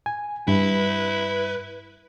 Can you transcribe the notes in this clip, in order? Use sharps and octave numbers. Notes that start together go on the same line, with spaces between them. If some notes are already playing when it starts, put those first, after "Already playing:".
G#5
G2 E4 B4